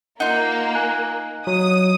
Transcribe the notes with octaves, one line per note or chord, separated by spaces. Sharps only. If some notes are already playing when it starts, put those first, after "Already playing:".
A#3 D#4 F4 F#5
G#5 F#6
F#3 D#6